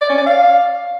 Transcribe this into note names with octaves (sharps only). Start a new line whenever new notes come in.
D5
C#4
D5
F5